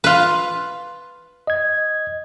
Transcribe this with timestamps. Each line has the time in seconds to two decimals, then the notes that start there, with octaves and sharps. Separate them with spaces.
0.04 F4 B4
1.47 D#5 G#6